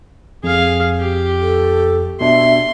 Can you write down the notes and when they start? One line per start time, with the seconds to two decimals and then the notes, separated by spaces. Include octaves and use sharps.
0.44 F2 G#4 F5
1.00 G4
1.41 A4
2.21 B2 D4 E5 C6